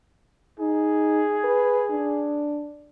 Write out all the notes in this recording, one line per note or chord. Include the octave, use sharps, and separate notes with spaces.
D#4 G#4
B4
D4